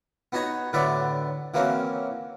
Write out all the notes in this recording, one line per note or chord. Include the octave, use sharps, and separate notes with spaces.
B3 D#4 F#4 C#5 A#5
A2 D3 F#3 B3 D5 E5
E3 F#3 A#3 C4 C#4